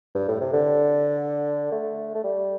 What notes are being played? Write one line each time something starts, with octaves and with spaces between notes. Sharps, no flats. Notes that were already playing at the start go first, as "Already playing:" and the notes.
G2
A2
C3
D3
A3
A3
G3